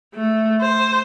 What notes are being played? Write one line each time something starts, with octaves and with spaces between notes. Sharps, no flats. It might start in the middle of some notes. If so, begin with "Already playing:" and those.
A3
C5